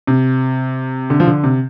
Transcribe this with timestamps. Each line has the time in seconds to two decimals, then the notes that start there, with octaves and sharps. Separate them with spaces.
0.07 C3
1.10 D3
1.20 F3
1.27 D3
1.44 C3